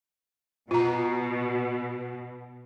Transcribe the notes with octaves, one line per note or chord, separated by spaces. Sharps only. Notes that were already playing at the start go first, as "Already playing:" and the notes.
B2 F4 A#5